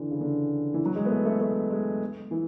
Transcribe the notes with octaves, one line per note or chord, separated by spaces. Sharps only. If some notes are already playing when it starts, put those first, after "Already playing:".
Already playing: D3 E3
C#3
D3
E3
F#3
G#3
B3
A3
A3
A3
G#3
E3